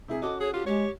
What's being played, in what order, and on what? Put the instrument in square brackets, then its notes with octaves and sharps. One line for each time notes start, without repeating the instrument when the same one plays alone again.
[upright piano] C3 E4 G#4
[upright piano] C#4 F#4 A4 [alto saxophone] D#5 [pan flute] D6
[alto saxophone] G#4 [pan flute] C#5
[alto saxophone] F4 [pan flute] G4
[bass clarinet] G#3 [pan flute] G4 [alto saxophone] C#5